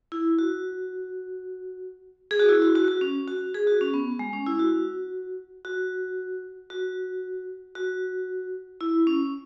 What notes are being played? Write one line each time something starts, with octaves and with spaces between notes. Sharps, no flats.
E4
F#4
G#4
F#4
E4
F#4
F#4
F#4
C#4
F#4
G#4
F#4
C#4
B3
G#3
C#4
E4
F#4
F#4
F#4
F#4
E4
C#4